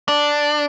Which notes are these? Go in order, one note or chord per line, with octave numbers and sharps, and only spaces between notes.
D4